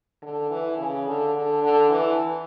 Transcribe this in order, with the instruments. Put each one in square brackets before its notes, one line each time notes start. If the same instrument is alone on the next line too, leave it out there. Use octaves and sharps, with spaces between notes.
[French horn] D3
E3
C#3
D3
D3
D3
E3